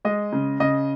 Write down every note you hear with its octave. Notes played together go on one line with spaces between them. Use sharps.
G#3 D#5
C#3
C#3 D#5